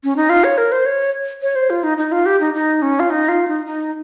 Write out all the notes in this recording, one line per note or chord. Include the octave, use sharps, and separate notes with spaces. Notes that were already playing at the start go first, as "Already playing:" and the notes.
C#4
D#4
F4
C#5
A#4
C5
C#5
C#5
C5
F4
D#4
D#4
F4
G4
D#4
D#4
C#4
F4
D#4
F4
D#4
D#4